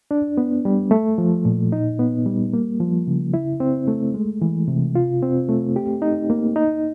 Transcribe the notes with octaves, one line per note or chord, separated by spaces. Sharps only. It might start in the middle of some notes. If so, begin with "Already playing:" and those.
D4
B3
G3
A3
F3
A#2
D#4
B3
G3
A#3
F3
C#3
E4
C4
A3
G#3
E3
C3
F4
C4
A3
G4
D#4
A#3
D#4